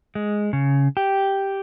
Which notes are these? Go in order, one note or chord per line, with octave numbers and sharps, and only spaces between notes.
G#3
C#3
G4